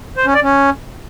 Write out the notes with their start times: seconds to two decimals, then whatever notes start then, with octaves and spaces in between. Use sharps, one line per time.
0.17 C5
0.26 C#4
0.34 D5
0.43 C#4